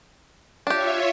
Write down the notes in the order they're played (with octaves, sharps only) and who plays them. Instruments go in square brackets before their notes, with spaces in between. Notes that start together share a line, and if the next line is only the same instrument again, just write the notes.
[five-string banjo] D4 G4 [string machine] F4 C#5 E5